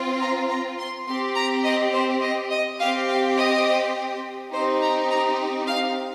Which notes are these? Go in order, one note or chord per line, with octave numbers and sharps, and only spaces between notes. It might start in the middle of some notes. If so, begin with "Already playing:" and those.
Already playing: C4 F4
A#5
A#5
C6
C4 G4 C6
A#5
D#5
C5
D#5
D#5
C4 G4 F5
F5
D#5
C4 D#4 G4 C5
A#5
A#5
F5